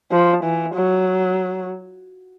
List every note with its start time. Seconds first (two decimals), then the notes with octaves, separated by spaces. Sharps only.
0.11 F3
0.44 E3
0.75 F#3